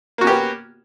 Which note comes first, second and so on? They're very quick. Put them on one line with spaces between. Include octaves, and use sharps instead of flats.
A#3 F#4 C#4 G4 B3